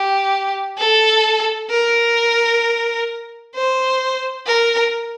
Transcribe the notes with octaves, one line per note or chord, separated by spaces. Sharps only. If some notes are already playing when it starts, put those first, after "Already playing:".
Already playing: G4
A4
A#4
C5
A#4